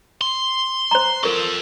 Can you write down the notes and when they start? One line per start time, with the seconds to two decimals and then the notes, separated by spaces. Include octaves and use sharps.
0.21 C6
0.91 C5 A#5
1.23 F4 A4 A#4 C#6